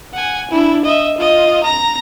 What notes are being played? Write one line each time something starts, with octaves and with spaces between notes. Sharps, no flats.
F#5 G#5
D4 E4
D#5 E5
F4 D#5
A#5 A#6